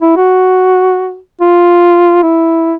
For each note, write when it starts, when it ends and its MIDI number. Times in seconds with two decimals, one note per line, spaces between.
0.02 0.15 64
0.17 1.18 66
1.41 2.18 65
2.23 2.74 64